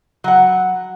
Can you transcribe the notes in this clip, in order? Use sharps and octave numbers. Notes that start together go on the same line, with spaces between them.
F#3 F#5